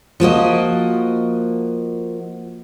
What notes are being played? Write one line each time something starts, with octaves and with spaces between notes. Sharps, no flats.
F3 A#3 F#4 D#5